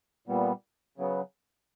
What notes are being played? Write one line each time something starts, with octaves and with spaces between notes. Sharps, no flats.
A#2 G3 B3
C#3 F#3 B3